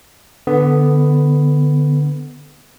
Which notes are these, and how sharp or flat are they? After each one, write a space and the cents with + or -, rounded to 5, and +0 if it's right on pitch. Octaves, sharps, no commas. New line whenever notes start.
D3 +0 B3 +10